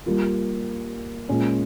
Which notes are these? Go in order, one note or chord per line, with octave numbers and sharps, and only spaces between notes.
G3 A#3 F4
A#2 G#3 C#4